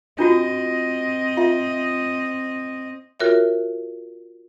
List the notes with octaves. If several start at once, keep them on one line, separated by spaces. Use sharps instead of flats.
C4 D4 F4 F#4 D#5
F4 E5
F4 F#4 A#4 C#5 E5